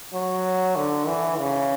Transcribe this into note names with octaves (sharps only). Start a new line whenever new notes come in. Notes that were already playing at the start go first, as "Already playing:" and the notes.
F#3
D3
E3
C#3